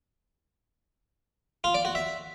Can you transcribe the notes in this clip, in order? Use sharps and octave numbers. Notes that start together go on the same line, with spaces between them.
F4
D5
F#4
E5